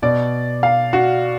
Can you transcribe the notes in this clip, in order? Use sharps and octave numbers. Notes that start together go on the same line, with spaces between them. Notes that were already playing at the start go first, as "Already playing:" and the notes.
B2 D5
F5
F#4